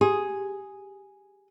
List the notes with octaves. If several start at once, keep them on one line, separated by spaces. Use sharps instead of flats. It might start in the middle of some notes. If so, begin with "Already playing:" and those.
G4 G#4